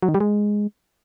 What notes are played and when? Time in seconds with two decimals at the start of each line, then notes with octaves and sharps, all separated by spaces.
0.03 F#3
0.09 D#3
0.14 G3
0.20 G#3